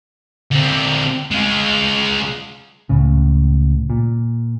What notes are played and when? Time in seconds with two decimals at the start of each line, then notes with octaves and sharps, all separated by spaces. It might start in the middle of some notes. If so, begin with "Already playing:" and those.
0.51 D3 C4
1.31 G#3 F4
2.89 C#2 A2 C#3
3.90 A#2